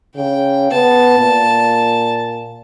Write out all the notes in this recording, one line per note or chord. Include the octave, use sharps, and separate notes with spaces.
C#3 G5
B3 A5
A#2